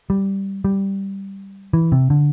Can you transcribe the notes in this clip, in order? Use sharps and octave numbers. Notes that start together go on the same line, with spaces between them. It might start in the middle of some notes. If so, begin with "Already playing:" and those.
G3
G3
E3
C3
D3